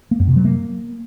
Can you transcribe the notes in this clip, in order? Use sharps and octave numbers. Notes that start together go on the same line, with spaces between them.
A#3
F#2
C3
F#3
A#3